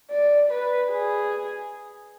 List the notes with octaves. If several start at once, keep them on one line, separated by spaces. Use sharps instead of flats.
D5
B4
G#4